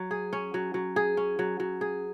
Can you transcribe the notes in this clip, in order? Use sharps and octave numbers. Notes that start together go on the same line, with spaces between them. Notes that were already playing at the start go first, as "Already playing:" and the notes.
Already playing: F#3
G#4
C#4
F#3
F#3
G#4
C#4
F#3
F#3
G#4